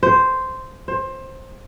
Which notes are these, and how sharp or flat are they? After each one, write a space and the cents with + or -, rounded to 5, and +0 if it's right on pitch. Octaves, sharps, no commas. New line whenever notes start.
C5 -5
C5 +20